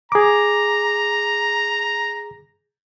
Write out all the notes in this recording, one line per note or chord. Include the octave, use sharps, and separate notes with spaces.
G#4 A#5 D6